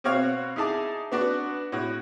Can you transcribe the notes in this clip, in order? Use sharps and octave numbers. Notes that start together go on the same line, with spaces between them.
B2 C4 F#4 C#5 F5
D#4 E4 G#4 A5 D6
B3 D4 F#4
A2 F#4